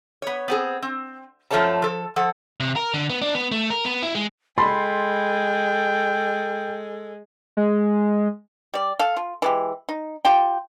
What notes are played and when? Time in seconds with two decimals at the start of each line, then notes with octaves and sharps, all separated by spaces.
0.22 B3 C#5
0.48 B3 C4 G#4
0.82 C4
1.51 F#2 F3 A3 A4 C#5 A5
1.82 F3 A4
2.16 F3 A4 F#5
2.60 C3
2.76 A#4
2.94 D3
3.10 B3
3.22 D4
3.34 B3
3.52 A3
3.70 A#4
3.85 B3
4.03 E4
4.15 G#3
4.58 G#3 A4 G5 B5 C6 A6
7.57 G#3
8.74 G3 D5
8.99 A4 F5
9.17 F4
9.42 E3 G#3 G4
9.89 D#4
10.25 F4 G4 G5